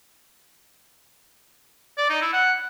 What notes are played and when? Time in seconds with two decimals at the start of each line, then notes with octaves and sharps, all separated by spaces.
1.98 D5
2.09 D#4
2.21 E4
2.33 F#5